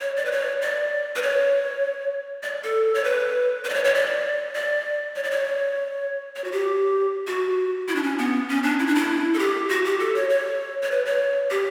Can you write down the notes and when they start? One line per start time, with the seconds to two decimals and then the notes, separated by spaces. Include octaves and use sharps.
0.01 C#5
0.17 D5
0.25 B4
0.32 C#5
0.62 D5
1.16 B4
1.22 C#5
2.43 D5
2.64 A4
2.94 C#5
3.04 B4
3.65 B4
3.69 D5
3.74 C#5
3.85 C#5
3.95 D5
4.55 D5
5.16 C#5
5.23 D5
5.31 C#5
6.36 C#5
6.44 F#4
6.52 G4
7.27 F#4
7.88 E4
7.96 D4
8.03 C#4
8.19 B3
8.49 C#4
8.63 D4
8.79 E4
8.87 D4
8.95 E4
9.34 A4
9.39 G4
9.69 F#4
9.85 G4
10.00 A4
10.15 C#5
10.30 C#5
10.83 C#5
10.91 B4
11.06 C#5
11.50 G4